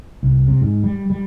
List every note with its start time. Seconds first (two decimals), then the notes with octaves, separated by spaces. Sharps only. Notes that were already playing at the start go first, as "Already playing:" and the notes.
0.23 C2
0.48 C3
0.61 G#2
0.84 G3
1.10 G3